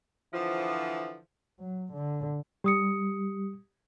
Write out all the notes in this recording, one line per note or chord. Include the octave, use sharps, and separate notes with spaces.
D3 E3 F3
F#3
D3
G3 G4 D#6 C#7